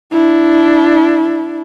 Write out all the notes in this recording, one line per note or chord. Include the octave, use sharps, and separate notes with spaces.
D4 E4